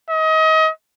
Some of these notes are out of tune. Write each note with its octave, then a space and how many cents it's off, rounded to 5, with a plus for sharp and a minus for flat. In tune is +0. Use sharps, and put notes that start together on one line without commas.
D#5 +30